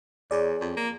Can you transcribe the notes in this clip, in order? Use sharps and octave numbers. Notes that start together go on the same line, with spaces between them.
E2 G#4 C#5 D5
F2
A#3